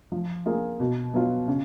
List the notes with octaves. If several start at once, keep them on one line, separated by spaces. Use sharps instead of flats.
F3
A#3 F4 G#4
B2
F#3 B3 F4
C#3